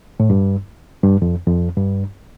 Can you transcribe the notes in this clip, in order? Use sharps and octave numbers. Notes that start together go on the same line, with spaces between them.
A2
G2
G2
F2
F2
G2